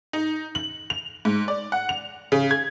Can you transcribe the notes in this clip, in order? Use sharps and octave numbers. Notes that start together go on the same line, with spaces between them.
D#4
F#7
F7
G#2
D5
F#5
F7
C#3
G#6